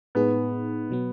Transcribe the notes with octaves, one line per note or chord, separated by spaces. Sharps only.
A2 G#3 B3 D#4 G#4
B2 F#3 B3